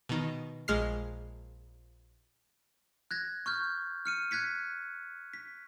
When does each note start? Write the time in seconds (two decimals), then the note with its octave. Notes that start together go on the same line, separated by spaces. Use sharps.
0.09 B2 D#3
0.68 A#1 G#3 F6 C7
3.11 F#6 G#6 A#6
3.46 C#6 F6 G6
4.05 F6 C#7 D#7
4.31 F#6 G#6 B6 C#7
5.33 B6